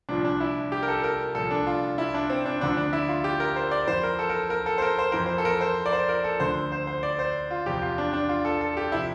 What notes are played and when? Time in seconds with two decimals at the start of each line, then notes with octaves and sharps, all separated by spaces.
0.09 C2 A#2 F3 D4
0.25 D4
0.40 E4
0.72 G4
0.83 A#4
0.88 A4
1.04 A#4
1.35 C2 A#2 F3 A4
1.51 D4
1.67 F4
1.98 E4
2.14 D4
2.30 C4
2.46 D4
2.61 D2 D3 F3 D4
2.77 D4
2.93 E4
3.08 F4
3.24 G4
3.40 A#4
3.56 C5
3.71 D5
3.87 F2 E3 C5
4.03 A#4
4.19 A4
4.29 A#4
4.50 A#4
4.66 A4
4.78 C5
4.82 A#4
4.98 C5
5.12 F2 E3 A#4
5.26 C5
5.38 A4
5.45 A#4
5.61 C5
5.86 D5
5.93 C5
6.09 A#4
6.24 A4
6.40 D2 D3 F3 C5
6.72 C5
6.87 C5
7.03 D5
7.19 C5
7.51 F4
7.66 E2 C3 F3 G4
7.82 F4
7.98 D4
8.13 D4
8.29 F4
8.45 A4
8.61 A4
8.77 G4
8.92 C3 F3 E4